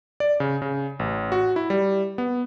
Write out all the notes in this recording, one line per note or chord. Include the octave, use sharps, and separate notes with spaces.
D5
C#3
C#3
A1
F#4
E4
G3
B3